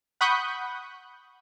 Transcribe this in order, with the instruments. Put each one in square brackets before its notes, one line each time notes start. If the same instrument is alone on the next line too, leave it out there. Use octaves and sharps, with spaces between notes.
[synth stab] F#5 B5 C#6 D#6 F#6 G6